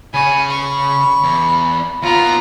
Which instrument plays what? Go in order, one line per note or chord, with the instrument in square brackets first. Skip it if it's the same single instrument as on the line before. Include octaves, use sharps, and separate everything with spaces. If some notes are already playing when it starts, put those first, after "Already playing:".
[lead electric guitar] C#3 C#5 [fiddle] G#5 [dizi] B5
[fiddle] C#6
[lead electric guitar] E2
[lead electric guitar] D#2 B3 [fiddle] F4 A#5